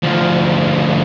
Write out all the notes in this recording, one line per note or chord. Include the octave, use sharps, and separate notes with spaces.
D2 F3